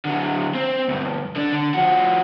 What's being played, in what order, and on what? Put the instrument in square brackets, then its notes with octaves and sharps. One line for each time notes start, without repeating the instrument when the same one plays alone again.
[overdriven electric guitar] D3 F#3
C4
D2 G2
D3 D4
D3
F3 F#4